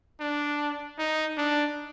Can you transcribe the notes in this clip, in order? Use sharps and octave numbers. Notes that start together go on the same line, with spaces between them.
D4
D#4
D4